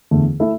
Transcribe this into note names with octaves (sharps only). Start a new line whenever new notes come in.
E2 D3 A3
A3 E4 A4 E5